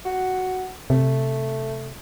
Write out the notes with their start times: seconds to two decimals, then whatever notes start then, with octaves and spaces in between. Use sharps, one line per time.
0.05 F#4
0.90 C3 A3